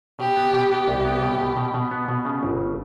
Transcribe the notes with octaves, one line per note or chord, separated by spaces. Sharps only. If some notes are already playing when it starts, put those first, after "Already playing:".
B2 G4
B3
B2
B3 G4
C2
B3
B2
B2
B2
B2
B3
B2
C#3
G1